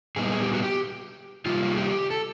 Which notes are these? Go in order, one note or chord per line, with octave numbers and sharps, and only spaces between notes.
A#2 G3 B3 D#4 G#4
G#4
G4
F#4
G4
C3 D#3 G3 A#3 F4
G#4
G4
A4